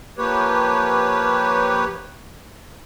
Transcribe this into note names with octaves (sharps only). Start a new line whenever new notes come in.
F3 A#3 G4 B4 C#5